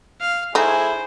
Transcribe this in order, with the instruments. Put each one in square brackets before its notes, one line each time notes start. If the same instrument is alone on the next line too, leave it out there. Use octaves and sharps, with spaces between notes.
[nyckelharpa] F5
[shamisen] A3 D#4 [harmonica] E4 G#4 [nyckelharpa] C5